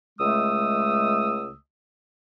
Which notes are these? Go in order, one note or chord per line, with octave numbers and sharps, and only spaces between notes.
C#2 G#3 A3 D#6 E6